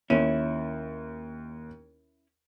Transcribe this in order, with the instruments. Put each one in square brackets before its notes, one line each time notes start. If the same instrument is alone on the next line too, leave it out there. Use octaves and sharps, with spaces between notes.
[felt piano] D#2 D#7 [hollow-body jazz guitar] C#4 E4